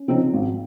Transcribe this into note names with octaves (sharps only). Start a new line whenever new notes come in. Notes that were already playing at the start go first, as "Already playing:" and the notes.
Already playing: C#4
C#3 F3 C4 D#4
G#1